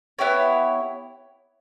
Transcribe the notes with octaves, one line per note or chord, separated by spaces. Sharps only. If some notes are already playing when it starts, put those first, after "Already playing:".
B3 E4 G4 C#5